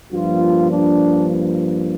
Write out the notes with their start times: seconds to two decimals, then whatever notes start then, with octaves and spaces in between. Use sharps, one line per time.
0.13 G2 F3 A#3 F4
0.70 D4